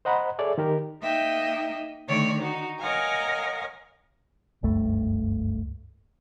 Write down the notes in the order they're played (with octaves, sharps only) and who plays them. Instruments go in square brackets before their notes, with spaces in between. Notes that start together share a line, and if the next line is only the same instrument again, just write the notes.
[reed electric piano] C5 D#5 F#5 A#5 B5
G#4 A4 C#5 D5 E5
D#3 G4 A#4
[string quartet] A#3 D#4 D#5 E5 G5
D3 D#3 A3 C#5 D5
D#4 F#4
A#4 C#5 D#5 F5 F#5 G#5
[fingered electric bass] F#1 C#2 G2 A3